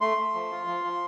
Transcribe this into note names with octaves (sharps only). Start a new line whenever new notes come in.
A3 C6
A3
F3
F4
F3
F3